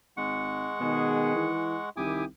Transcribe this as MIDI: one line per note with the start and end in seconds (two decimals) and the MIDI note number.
0.17 0.72 32
0.17 1.89 56
0.17 1.89 78
0.17 1.89 85
0.80 1.34 47
0.80 1.54 51
0.80 1.54 68
1.36 1.78 52
1.97 2.26 36
1.97 2.24 51
1.97 2.24 64
1.97 2.24 67
1.97 2.25 80
1.97 2.25 86
1.97 2.25 87